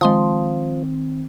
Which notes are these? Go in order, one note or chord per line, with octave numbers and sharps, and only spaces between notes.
D#3 F3 G#3 C4 C6 D#6